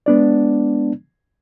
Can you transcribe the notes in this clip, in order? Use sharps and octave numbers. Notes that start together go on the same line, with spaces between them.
G#3 B3 D4 D5